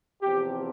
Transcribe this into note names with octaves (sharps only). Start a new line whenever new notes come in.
E2 C3 F3 G4